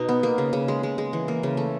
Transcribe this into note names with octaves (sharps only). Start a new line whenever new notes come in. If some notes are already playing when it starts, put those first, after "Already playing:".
Already playing: B2 D#4
B3
A#3
C#3
C#3
G#3
G#3
G#3
E3
A#3
C#3
A3